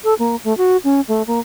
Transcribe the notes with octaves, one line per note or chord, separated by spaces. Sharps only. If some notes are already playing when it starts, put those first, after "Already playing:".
A4
A#3
A3
F#4
C#4
A3
A#3